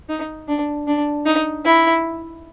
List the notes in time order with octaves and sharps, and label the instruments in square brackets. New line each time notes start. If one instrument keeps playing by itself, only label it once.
[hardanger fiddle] D#4
D4
D4
D#4
E4